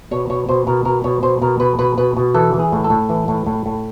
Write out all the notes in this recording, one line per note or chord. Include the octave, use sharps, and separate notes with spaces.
B2 C#5
B2 C#5
B2 C5
B2 A#4
B2 A#4
B2 C#5
B2 C5
B2 A#4
B2 B4
B2 B4
B2 B4
B2
E3 A4
E3
G#4
A2
A4
A2
E3
A2
A2
A2